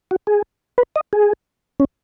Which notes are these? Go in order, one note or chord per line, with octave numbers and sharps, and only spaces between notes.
F#4
G#4
B4
D#5
G#4
C#4